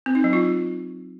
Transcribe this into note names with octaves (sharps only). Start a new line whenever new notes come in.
C4
D#4
F#3
F4